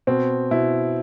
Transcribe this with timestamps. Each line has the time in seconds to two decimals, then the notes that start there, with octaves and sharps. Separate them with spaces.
0.07 B2 C4
0.51 B2 E4